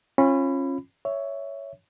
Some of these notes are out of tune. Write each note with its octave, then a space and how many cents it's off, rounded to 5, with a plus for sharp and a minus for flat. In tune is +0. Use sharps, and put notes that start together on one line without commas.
C#4 -30 F4 -5 B5 +15
C#5 +10 E5 +0